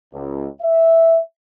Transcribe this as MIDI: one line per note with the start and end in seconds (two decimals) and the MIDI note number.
0.14 0.47 37
0.62 1.19 76